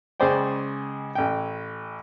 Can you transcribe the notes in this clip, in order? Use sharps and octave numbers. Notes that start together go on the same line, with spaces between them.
C#2 C#3 G#4 C5 D5 G5
A1 G5